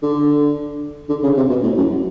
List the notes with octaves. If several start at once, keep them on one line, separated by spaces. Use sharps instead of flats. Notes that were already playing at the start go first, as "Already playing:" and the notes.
D3
D3
C#3
C3
B2
A2
F#2